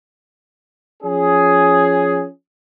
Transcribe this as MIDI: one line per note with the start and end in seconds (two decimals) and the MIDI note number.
1.03 2.26 53
1.03 2.26 61
1.03 2.26 68